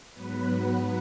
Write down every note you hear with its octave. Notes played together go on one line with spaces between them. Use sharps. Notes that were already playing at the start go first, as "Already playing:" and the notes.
G#2 F#3 B3 B4